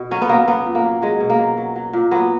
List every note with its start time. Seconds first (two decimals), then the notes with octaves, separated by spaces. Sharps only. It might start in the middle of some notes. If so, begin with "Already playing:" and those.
Already playing: B2
0.11 F#3 C#4
0.22 B3
0.29 F#3 A#3
0.48 F#3 B3
0.66 A#2
0.75 A#3
0.84 F#3
1.02 F#3 G#3
1.20 B2
1.30 A#3
1.39 F#3
1.57 F#3
1.76 F#3
1.93 A#2
2.11 F#3 B3